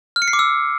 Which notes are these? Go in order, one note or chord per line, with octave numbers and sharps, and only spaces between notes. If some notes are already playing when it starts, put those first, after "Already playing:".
F6
C#7
C7
D6
E6